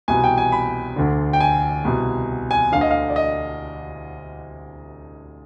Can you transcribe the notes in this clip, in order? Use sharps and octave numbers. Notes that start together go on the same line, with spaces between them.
C2 B2 G#5
G5
G#5
B5
D2 D3
G5
G#5
C2 B2
G#5
D2 D3 F5
D#5
F5
D5
D#5